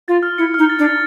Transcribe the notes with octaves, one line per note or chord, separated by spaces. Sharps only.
F4 A6
F6
E4 C#7
D#4 F6
A6
D4
A6